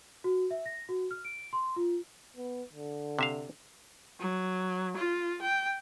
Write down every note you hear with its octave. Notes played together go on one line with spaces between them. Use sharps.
F#4
E5
A#6
F#4
F6
D7
C6
F4
B3
D3
C3 E5 F5
F#3
F4
G5